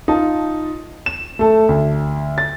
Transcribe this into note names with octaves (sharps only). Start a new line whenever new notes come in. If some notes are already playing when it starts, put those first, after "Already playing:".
D#4 F4 A5
E7
A3 A4
D2
A6